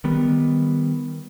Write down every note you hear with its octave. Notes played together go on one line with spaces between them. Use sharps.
D#3 G3 B3